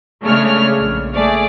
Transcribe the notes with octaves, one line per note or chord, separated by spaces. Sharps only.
C#3 G#3 A3 D4 C#5 F6
A#1
A3 G#4 D5